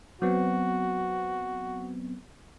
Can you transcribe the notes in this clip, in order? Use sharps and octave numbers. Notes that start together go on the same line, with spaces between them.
F#3 B3 C4 F#4